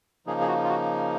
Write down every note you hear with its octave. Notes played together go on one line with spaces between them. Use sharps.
C#3 F3 A#3 D#4 G#4
G#4
F#4
F4
F#4